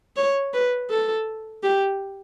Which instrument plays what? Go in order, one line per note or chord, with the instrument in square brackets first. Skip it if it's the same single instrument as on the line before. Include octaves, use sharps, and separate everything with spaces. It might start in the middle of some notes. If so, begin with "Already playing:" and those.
[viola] C#5
B4
A4
G4